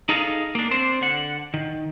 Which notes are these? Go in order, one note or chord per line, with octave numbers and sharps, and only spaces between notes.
D#4 G#4 A4 D#5 F5
A#3 D4
C4 D4 C5
D3 F#5
D#3